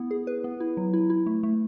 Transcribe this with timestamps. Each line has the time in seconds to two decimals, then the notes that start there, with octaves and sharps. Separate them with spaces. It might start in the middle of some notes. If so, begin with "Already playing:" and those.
Already playing: B3 E4
0.11 G#4
0.27 B4
0.44 B3
0.60 E4
0.77 F#3
0.93 E4
1.10 E4
1.26 A3
1.43 A3